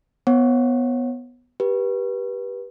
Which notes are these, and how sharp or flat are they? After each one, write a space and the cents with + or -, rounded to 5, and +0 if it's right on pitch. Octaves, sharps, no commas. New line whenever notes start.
B3 +0 C#5 -30 F#5 +0
G4 +0 B4 -25